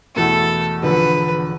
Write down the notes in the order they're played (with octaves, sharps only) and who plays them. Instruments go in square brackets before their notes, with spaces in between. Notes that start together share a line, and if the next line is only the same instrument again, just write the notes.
[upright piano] E2 B2 A3 E4 [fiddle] A4
[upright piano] E1 E2 D3 F3 [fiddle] B4